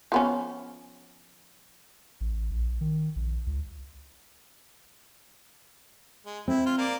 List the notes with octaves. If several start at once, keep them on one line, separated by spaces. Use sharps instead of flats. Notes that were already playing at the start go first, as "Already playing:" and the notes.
F3 B3 C#4
A1
A#1
D#3
A#1
C#2
G#3
C4 E4
F4
A#3 D5